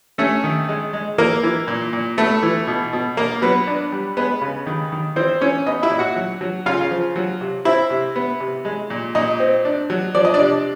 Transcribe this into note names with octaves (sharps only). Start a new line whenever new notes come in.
A3 C#4 A4
D#3
G#3
G#3
E3 A#3 A#4
E3
A#2
A#2
A3 B3 A4
E3
B2
B2
A#3 A#4
F#3 B3 B4
D4
G3
G#3 B3 B4
C#3
D#3
D#3
E3 C4 C5
E3 C#4 C#5
B3 D#4 D#5
E4 E5
A#2
F#4 F#5
F#3
F#3
C#3 F4 F5
F3
F#3
C3
C4 E4 E5
C3
B3
C3
G#3
A#2
A#2 D#4 D#5
C4
D4
F#3
F3 D5
D#5
D4 D5
C3